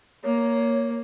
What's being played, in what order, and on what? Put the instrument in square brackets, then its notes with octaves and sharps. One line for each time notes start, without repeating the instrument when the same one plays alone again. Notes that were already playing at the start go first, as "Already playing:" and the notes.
[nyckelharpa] A#3 [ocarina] C#5